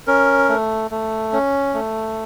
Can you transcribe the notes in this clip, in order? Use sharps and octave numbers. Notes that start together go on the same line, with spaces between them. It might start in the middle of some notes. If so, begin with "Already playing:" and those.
C#4 A#4
A3
A3
C#4
A3